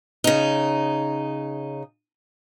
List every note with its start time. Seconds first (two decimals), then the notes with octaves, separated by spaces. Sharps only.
0.24 C#3 D#4